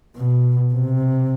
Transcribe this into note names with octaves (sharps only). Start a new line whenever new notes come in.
B2
C3